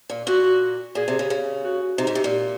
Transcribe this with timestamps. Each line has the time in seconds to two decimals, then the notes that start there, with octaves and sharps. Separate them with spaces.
0.10 A#2
0.27 A#2 F#4
0.95 A#2 G#4
1.08 C3
1.19 C#3
1.30 C#3
1.64 F#4
1.98 C3 D#4
2.07 G#2
2.15 C3
2.24 A#2